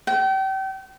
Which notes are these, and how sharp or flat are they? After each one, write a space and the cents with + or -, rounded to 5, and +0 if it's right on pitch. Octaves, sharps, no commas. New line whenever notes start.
G5 -35